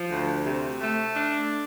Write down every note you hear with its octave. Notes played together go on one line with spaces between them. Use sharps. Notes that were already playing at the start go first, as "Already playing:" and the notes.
Already playing: F3
D2
C3
A3
D4